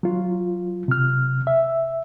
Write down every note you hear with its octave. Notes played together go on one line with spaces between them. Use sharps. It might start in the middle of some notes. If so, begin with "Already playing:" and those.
F#3 F4
C3 F6
E5